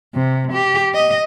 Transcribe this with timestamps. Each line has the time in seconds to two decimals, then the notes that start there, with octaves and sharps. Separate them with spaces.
0.14 C3
0.53 G4
0.95 D#5